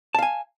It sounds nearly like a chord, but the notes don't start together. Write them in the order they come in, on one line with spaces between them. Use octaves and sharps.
A5 F5 G#5